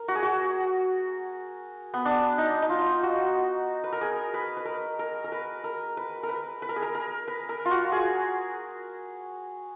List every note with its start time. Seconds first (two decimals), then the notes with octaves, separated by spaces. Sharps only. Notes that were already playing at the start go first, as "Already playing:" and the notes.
Already playing: A#4
0.08 F#4
0.15 G#4
0.23 F#4
1.94 B3
2.05 D4
2.38 D#4
2.62 D#4
2.69 F4
3.03 F#4
3.84 B4
3.93 A#4
4.01 G#4
4.34 B4
4.57 B4
4.65 A#4
4.99 A#4
5.24 A#4
5.32 B4
5.64 A#4
5.97 B4
6.23 A#4
6.29 B4
6.62 B4
6.69 A#4
6.76 G#4
6.82 A#4
6.95 A#4
7.28 B4
7.49 A#4
7.65 F4
7.71 F#4
7.92 G#4